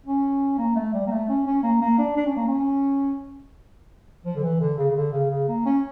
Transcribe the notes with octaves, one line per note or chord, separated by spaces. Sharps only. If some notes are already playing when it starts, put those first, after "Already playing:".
C#4
A#3
A3
G3
A#3
A3
C#4
C#4
A#3
A#3
D4
D4
C#4
A#3
C#4
F3
D3
E3
D3
C#3
C#3
D3
C#3
C#3
A#3
C#4